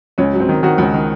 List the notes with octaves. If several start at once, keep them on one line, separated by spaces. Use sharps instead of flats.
C#2 C#4
F#3
C4
D#3
D#3 F#4
C#2
D#3